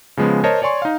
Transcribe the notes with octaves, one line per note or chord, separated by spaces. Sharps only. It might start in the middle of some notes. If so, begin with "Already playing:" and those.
C#3 F3 G#3 B3
A#4 C5 C#5 D#5 A5
C#5 D5 G#5 C6 C#6
D#4 F5